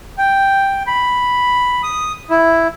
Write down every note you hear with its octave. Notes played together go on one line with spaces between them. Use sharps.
G5
B5
D#6
E4